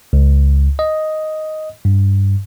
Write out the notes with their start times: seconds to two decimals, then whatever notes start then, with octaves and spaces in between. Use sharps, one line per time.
0.13 C#2
0.79 D#5
1.85 G2